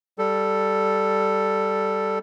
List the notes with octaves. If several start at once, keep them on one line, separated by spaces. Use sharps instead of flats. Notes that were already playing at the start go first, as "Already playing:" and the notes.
G3 A4